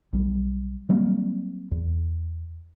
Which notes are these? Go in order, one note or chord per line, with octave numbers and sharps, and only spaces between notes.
B1 G3
F#3 G3 A#3 C4
E2